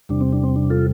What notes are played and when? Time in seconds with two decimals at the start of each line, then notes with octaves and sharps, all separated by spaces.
0.09 E2 C3 G3 D4
0.21 C4
0.33 D4
0.43 C4
0.56 D4
0.70 F4 A4